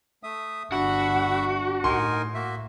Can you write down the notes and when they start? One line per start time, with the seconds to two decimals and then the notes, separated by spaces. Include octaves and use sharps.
0.23 A3 E5 D#6
0.72 G1 D4 F#4 E5 F#5 B5
1.84 A2 D#4 A#4 G#5 C6
2.34 A#3 F#4 E5